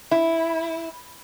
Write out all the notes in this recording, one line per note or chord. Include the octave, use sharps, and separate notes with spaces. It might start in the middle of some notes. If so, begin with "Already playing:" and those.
E4